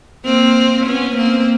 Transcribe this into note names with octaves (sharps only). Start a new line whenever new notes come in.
A#3 C4
B3 C#4
A#3 C4